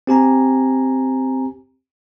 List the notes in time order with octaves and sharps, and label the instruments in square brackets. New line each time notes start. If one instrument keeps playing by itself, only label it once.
[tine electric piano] C4 G4 G#5 A#5